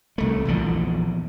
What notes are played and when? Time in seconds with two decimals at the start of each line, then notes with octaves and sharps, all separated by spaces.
0.18 C2 A3
0.45 A#1 E2 D3 F3